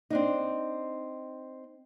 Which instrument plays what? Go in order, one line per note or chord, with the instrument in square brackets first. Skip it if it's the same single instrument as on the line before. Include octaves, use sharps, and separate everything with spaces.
[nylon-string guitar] C4 D4 D#4